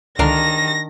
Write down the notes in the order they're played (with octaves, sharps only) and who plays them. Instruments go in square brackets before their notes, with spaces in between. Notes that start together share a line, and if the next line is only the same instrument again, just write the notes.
[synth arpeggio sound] C#2 D3 [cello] D#3 [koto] D4 A#4 F5 [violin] A#6